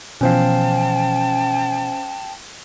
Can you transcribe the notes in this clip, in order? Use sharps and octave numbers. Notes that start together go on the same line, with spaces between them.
B2 E3 F3 C#4 C5 F5 G5 A5